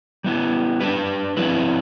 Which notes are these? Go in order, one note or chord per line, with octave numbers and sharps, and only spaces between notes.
G3 B3 E4
G3 D4 G4 B4
F3 C4 E4 B4